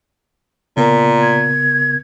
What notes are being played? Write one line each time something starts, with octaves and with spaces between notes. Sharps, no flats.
A#2 C#3 B3 A#4
G#6